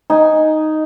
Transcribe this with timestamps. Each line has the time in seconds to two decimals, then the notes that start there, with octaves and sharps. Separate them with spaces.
0.10 D#4 G#5